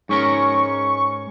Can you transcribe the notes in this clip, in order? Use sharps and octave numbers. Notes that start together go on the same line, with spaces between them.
G#2 C#4 A#4 C#6